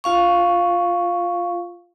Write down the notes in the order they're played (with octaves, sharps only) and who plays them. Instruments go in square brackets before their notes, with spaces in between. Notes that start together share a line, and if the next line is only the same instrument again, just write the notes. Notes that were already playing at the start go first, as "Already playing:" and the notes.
[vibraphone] F4 F5 C#6